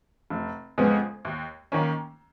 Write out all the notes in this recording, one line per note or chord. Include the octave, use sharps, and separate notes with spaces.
F1
F2 C#3 G#3 B3
D#2
D#3 A#3 C#4